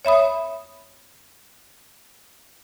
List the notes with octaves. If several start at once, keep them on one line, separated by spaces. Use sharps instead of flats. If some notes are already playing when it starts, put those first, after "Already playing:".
C#5 E5 B5 D#6